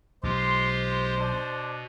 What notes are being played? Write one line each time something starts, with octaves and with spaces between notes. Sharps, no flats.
B1 G#3 F4 G4 C5 C6
B2 D4